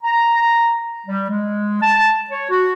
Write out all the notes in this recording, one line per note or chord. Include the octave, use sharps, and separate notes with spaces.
A#5
G3
G#3
A5
C#5
F#4